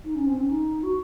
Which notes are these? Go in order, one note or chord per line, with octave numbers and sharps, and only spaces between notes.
D#4
C#4
C4
C#4
D#4
F#4